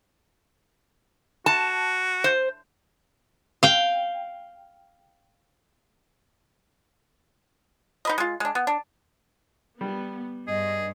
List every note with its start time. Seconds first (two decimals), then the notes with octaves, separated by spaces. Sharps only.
1.46 F#4 A5
2.24 C5
3.63 F5 G5
8.05 D#4 B4 D#5
8.18 G#3 F4
8.40 G#3 D4
8.55 B3
8.67 D4
9.81 G3 B3
10.47 G2 G#4 D#5